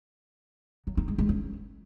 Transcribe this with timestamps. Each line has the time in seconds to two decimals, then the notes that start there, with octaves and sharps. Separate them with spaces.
0.87 F#3
0.97 D#4
1.08 G#3
1.18 G#3
1.29 C#4